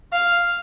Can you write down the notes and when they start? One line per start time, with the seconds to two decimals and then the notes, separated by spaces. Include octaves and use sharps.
0.13 F5